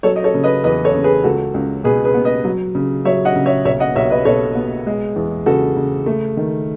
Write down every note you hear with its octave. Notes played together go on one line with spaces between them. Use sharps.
F#3 A4 C#5
D#5
A4 C#5
C#3
B4 D#5
E2 B4 D#5
A4 C#5
C#3
G#4 B4
C#2 F#4 A4
C#2
B2 G#4 B4
G#4 B4
B3
B4 D#5
F#3
C#3
F#3 C#5 E5
D#5 F#5
C#3
C#5 E5
B1 C#5 E5
D#5 F#5
B1 C#5 E5
B4 D#5
B2 A4 C#5
B3
G#3
E2
C#3 F#4 A4
C#3
A3
D#3